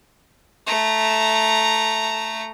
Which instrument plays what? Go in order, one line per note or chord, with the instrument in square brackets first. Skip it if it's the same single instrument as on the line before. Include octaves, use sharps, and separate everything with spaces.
[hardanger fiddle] A3 A#5